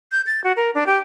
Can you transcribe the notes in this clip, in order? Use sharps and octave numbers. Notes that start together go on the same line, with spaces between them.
G6
A6
F#4
A#4
D4
G4